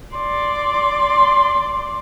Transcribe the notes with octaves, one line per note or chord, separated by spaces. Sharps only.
D5 C6